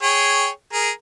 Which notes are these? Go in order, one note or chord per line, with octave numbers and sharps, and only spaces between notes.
G#4 C#5 G5
G#4 A#4